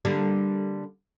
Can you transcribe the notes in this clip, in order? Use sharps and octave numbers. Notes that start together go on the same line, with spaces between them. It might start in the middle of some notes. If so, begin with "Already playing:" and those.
D3 G3 A#3